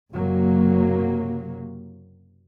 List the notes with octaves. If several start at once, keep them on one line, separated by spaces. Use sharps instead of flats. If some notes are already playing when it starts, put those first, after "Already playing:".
F#1 C3 F#3 A#3